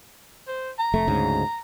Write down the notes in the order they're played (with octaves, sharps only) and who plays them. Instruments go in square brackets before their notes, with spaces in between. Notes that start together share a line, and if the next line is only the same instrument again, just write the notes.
[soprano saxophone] C5
A#5
[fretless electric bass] F1 A3
D2 G#2 C#3